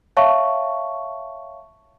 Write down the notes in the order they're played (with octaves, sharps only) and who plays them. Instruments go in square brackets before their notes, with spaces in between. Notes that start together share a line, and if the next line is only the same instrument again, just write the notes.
[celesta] C#5 E5 F5 A5 C#6